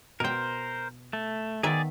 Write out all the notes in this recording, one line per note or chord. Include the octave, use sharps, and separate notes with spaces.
B2 A#4 C5 G5
A3
D#3 B3 G#4 D5 E5